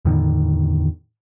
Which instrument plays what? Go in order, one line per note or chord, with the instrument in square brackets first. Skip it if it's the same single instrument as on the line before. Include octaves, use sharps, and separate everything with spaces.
[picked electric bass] E2 A2 D3 D#3